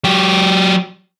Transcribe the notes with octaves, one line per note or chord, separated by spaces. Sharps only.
F#3 G4